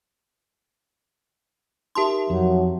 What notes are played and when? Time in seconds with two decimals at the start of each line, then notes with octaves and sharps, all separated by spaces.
1.95 D#4 G4 A#4 E5 A5 C6
2.30 F2 F#3